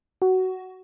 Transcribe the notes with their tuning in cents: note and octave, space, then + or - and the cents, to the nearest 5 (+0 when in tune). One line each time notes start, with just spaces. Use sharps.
F#4 +15